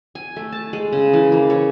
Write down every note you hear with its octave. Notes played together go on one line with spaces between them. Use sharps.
G#5
A3
A5
G#3
C#3
E3
A#3
C#5